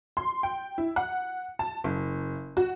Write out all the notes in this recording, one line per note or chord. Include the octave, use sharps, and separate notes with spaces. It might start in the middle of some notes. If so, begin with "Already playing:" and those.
C6
G5
E4
F#5
A5
F#1
F#4